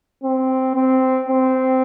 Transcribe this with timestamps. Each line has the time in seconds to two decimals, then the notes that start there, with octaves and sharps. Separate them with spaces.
0.23 C4
0.76 C4
1.29 C4